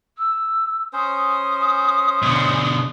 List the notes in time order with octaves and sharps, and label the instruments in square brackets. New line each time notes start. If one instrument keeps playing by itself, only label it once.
[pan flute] E6
[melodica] C#4 C5 [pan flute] D#6
[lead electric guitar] B2 D3